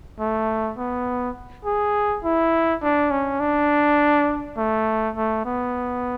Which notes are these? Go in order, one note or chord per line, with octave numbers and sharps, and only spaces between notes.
A3
B3
G#4
E4
D4
C#4
D4
A3
A3
B3